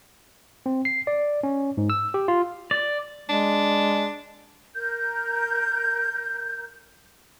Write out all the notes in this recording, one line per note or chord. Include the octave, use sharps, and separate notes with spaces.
C4
C7
D5
C#4
G#2
E6
G4
F4
D5
G#3 D4
A#4 G6